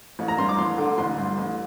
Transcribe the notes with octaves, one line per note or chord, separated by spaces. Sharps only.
A1
A#5
G2 C6
D6
A1 C6
D3
A1 C6
G2
A1